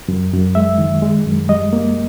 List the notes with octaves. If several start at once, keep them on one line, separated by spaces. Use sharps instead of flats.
F#2
F#2
G#3 E5
D#3
G#3
F#2
G3 D#5
A#3